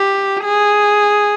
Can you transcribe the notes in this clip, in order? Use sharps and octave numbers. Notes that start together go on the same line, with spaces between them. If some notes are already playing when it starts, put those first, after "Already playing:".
Already playing: G4
G#4